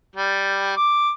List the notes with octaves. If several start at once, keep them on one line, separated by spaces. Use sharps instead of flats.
G3
D6